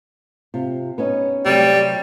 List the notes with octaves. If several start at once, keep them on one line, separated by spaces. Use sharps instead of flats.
C3 F4
B3 C#4 D#4
C3 F#3 G3 A3